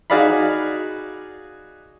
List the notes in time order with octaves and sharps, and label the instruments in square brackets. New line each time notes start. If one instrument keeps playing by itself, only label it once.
[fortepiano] D#4 F#4 G#4 D5 F5 B5